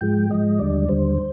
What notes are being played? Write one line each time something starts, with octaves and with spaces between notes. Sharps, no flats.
G#2 F3 G#3 G5
G#2 F3 G#3 D#5
D#2 D3 G3 D5
D#2 D3 G3 C5